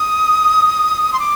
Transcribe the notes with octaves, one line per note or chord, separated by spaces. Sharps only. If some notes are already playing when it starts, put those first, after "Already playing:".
Already playing: D#6
C6
D6